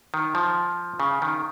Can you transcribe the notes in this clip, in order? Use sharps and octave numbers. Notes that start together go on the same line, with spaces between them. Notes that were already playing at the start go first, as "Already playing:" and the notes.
D#3
F3
C#3
D#3